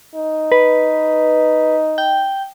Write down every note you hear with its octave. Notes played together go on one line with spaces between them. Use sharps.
D#4
B4
G5